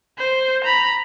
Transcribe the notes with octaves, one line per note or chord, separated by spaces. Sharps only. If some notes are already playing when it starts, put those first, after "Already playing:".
C5
A#5 B5